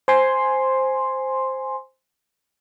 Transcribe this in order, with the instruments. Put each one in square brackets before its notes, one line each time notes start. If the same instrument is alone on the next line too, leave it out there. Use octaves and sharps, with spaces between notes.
[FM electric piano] C5 G#5 C6